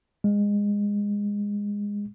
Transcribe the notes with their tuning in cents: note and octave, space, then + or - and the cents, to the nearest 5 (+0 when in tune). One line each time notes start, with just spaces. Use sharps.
G#3 -20